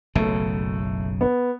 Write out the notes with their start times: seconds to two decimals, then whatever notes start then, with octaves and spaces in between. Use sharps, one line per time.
0.15 F#1 B1 C#3 A3
1.21 B3